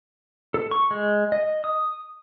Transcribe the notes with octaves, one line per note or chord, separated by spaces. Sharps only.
A4
C#6
G#3
D#5
D#6